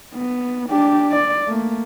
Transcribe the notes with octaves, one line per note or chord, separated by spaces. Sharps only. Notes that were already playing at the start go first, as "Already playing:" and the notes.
B3
D4 G4
D5
A3 A#3